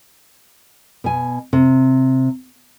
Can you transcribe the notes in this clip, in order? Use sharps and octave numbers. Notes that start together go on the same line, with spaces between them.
B2 G#5
C3